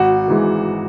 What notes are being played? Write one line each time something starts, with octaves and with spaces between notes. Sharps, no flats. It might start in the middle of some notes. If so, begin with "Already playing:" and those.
Already playing: G#1 F#4
G#2 E3 G#3